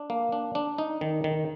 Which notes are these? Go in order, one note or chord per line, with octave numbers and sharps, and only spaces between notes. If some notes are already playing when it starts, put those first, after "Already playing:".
Already playing: D4
A#3
D4
D4
D#4
D#3
D#3